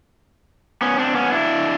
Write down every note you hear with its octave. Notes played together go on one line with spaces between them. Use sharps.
B3 C#4
C4 D4
B3 C#4
D4 E4